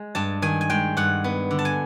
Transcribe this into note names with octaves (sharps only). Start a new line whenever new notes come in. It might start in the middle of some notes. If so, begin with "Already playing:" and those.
Already playing: G#3
G2 A5
D#3 G#5
G#5
G#3 G5
G2 F#5
B3
D3
A5
G#5